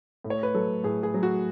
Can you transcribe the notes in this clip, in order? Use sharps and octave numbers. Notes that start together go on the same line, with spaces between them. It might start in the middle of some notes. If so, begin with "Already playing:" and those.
A2
C#5
B4
F#3 A4
A2 G#4
G#4
F#3
F#4